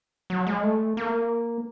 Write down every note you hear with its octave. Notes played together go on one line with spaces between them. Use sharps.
F#3
G#3
A3
A#3